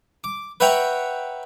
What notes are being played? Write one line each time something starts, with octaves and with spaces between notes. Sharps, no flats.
D6
B4 C#5 E5 F#5 G5 A#5